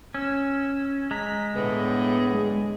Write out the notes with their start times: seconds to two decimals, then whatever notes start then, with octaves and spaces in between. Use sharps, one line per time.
0.14 C#4 E6
1.11 G#3 A#5 B6
1.55 A2 D3 B3 G#4
2.34 G#3